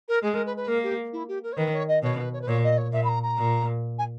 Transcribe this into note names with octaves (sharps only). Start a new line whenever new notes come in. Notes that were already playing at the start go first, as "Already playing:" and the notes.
A#4
G#3 G#4
A#4
B4
B4
A#3 A#4
G4
E4
G4
A#4
C#5
D#3 B4
C#5
D#5
B2 C#5
B4
C#5
B4
A#2 C#5
D#5
C#5
A#2 E5
B5
A#5
A#5
A#2
G#5